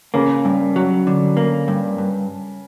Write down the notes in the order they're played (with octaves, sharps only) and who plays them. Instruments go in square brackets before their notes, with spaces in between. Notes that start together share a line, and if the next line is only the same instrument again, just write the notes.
[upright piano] C#3 [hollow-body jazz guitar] A#3
[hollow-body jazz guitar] G2
F#3
D3
A#3
G2
G2